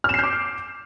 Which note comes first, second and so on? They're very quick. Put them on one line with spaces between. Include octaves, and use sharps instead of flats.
F6 E7 C7 G6 D6